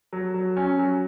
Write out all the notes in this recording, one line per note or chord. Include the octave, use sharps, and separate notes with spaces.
F#3
F#3
C#4
F#3